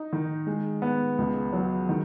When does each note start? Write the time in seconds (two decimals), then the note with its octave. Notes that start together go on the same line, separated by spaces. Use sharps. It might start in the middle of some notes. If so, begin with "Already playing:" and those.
Already playing: D#4
0.13 D#3
0.47 G#3
0.82 B3
1.18 C#2
1.53 F#3
1.89 D#3